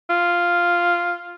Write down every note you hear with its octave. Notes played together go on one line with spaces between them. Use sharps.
F4